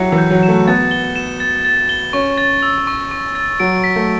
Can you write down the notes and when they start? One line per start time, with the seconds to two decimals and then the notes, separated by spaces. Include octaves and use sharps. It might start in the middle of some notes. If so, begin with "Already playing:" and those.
Already playing: F#3 E4 F#4 G4 C#7
0.12 E3
0.18 G6
0.30 F#3
0.43 E7
0.48 A3
0.68 B3 A6
0.91 G7
1.16 E7
1.40 A6
1.65 A6
1.89 G7
2.13 C#4 C#6
2.38 A6
2.62 E6
2.87 C#6
3.11 C#6
3.35 A6
3.60 F#3 D7
3.84 B6
3.96 A3